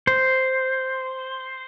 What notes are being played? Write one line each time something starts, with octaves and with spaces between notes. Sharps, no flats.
C5